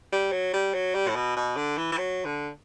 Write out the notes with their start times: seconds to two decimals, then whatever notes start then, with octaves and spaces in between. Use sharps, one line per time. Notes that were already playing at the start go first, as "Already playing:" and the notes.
0.12 G3
0.32 F#3
0.54 G3
0.74 F#3
0.95 G3
1.08 A2
1.15 B2
1.37 B2
1.57 D3
1.77 E3
1.92 E3
1.98 F#3
2.25 D3